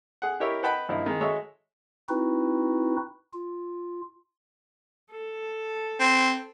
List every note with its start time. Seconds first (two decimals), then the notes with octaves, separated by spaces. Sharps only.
0.22 G#4 F#5
0.40 E4 G4 A#4 C#5 D#5 E5
0.63 B4 D#5 F#5 G5 A5 B5
0.89 G2 F3 A#3 D#4 E4
1.06 D#3 G#3
1.21 G#3 F#4 A4 C#5 D#5 E5
2.09 C4 D#4 E4 F#4 B4
3.33 F4
5.11 A4
6.00 C4